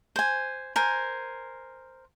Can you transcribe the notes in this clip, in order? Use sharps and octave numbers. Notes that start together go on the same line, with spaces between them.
C5 G#5
A#4 C5 G#5